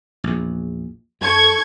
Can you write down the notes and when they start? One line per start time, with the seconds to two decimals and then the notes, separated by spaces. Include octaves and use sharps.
0.24 A#1 E2
1.21 F#2 A4 C#6 G#6